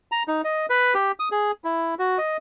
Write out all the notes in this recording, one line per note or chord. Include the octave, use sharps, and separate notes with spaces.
A#5
D#4
D#5
B4
G4
D#6
G#4
E4
F#4
D#5